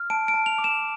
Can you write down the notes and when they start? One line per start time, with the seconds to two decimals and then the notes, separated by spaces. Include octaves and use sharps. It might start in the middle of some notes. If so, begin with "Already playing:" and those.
Already playing: F6
0.10 A5 D7
0.28 D7
0.34 A5
0.46 F7
0.58 D6
0.64 E7